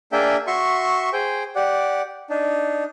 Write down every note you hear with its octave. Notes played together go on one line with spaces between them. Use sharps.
A#3 D4 G#4 E5 G5
F#4 E5 C6 C#6
G#4 C5 G5
G4 D5 F#5
D4 D#4